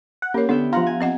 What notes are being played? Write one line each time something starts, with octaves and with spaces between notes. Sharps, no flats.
F#5
A#3 C#4 G4 C#5
D3 B3 D4 E5 G5
F3 F4 F#5 A#5
G#5
C4 D#5 F#5